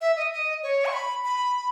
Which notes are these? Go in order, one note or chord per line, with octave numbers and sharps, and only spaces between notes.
E5
D#5
D#5
C#5
C#6
B5
B5